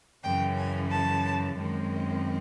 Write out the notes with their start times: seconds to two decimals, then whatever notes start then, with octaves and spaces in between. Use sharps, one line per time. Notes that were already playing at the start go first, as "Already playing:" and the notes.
0.23 F#2 C#3 E3 G5
0.57 G#5
0.90 A5
1.55 F#2 D#3 G#3 C4